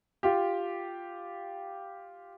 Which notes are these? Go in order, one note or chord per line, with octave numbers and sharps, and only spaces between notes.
F4 G4